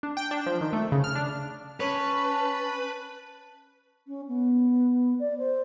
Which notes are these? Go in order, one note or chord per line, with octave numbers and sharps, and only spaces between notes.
D4
G5
D4
F3
D#3
A3
C#3
F6
D4
C#4 B4 C#5 A5
C#4
B3
D5
C5